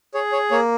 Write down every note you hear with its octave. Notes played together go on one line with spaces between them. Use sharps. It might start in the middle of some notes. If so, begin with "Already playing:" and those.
G#4 C#5
C#5
A#3 C#5